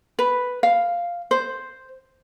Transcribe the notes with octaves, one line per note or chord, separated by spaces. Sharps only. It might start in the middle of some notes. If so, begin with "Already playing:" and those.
B4
F5
C5